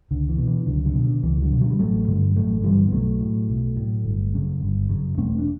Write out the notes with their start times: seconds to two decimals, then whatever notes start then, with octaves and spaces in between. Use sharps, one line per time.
0.11 C#2 D3
0.29 E3
0.38 B2
0.47 E3
0.66 C#2 D3 F#3
0.85 D3 F#3
0.94 B2
1.04 D3
1.23 C#2 E3
1.42 D3 F#3
1.52 B2
1.61 D3 F#3
1.70 G3
1.79 A1 F#3 A3
2.08 G2 D3
2.36 A1 F#3 A3
2.63 G2 D3 E3 G3
2.87 B3
2.92 B1 F#3 A3
3.20 A2
3.48 B1
3.77 A2
4.04 G1
4.33 F#2 C#3
4.61 G1
4.89 F#2 C#3
5.17 E1 A3 C#4
5.38 D4